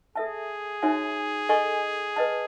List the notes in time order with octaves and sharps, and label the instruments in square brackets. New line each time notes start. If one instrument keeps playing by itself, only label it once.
[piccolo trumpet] G#4 [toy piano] A4 E5 A5
[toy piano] D#4 F#4 C#5 E5 G#5
A4 D#5 G#5 C#6
B4 D#5 A5